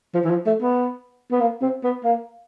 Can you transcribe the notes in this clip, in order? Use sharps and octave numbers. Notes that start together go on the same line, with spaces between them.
F3
E3
F3
A3
B3
B3
A#3
C4
B3
A#3